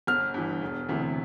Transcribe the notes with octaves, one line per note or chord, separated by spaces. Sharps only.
G1 F6
G2 E3
E1
D2 C3 E3